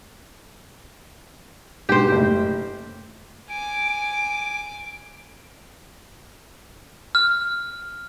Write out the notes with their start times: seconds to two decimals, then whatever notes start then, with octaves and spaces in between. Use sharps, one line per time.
1.89 G#2 B2 D4 G4 C5
2.07 F#1 A2
3.50 G#5 D6 D7
7.15 F6